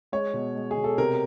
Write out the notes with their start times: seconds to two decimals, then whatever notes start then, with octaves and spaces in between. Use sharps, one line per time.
0.12 G#3 C#5
0.34 B2
0.56 G#3
0.71 G#4
0.77 B2
0.84 A4
0.98 C3 A#4